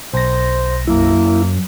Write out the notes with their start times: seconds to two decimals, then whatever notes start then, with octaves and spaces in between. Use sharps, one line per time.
0.14 B1 C5 A#6
0.87 F#2 A#3 E4